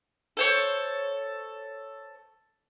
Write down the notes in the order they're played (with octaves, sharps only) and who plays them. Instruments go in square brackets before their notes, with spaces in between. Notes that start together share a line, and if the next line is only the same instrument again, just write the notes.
[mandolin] A4 C5 C#5